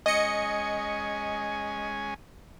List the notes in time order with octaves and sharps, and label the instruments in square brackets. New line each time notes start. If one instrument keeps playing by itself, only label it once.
[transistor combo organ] G#3 C#4 G#5 [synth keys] D#5 C#7